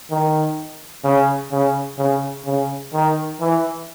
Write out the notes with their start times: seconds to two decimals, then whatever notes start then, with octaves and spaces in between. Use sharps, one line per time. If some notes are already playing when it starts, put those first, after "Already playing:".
0.11 D#3
1.04 C#3
1.52 C#3
1.98 C#3
2.46 C#3
2.93 D#3
3.40 E3